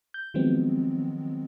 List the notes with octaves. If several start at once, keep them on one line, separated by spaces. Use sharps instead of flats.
G6
D#3 F3 F#3 G#3 B3 C4